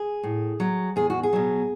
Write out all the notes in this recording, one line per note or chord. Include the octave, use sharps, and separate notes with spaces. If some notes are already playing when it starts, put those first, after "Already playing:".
Already playing: G#4
A2
F#3
E2 G#4
F#4
G#4
B2 F#3